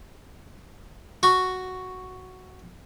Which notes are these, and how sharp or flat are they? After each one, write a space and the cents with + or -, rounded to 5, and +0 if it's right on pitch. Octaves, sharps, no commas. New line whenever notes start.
F#4 +0 C#6 +0